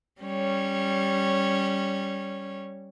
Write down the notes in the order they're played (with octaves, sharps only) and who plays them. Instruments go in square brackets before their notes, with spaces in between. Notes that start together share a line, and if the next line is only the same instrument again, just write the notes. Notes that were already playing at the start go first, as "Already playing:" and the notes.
[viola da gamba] G3 C#4 C#5